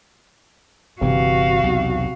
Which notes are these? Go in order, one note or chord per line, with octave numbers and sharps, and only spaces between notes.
G1 C3 E3 F#4 F5
B1 E2